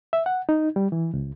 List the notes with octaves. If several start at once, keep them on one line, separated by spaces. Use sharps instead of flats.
E5
F#5
D#4
G3
E3
C#2